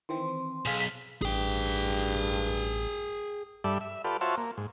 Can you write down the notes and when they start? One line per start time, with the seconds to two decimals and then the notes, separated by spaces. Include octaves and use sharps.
0.09 D#3 E3 C4 C6
0.65 B1 G#4 F5 B6
1.22 A1 G2 G#4 G5
3.64 G2 G3 D4 A4 E5
3.81 E5
4.04 F4 G4 A4 B4 D5
4.21 F4 F#4 C5 C#5 E5 A5
4.37 A#3
4.58 G#2